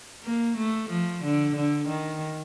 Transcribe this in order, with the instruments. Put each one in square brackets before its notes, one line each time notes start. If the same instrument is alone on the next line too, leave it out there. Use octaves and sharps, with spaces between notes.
[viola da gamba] A#3
A3
F3
D3
D3
D#3